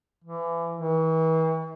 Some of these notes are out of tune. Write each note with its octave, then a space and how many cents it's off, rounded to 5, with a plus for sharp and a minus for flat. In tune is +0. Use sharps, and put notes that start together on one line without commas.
E3 +30
E3 -40